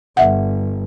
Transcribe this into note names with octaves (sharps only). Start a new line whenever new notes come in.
G1 E5 F#5